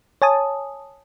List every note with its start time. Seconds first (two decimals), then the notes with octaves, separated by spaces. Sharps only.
0.22 C#5 G#5 A5 D#6